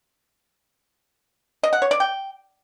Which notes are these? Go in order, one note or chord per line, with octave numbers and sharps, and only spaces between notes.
D#5
F#5
C#5
D5
G5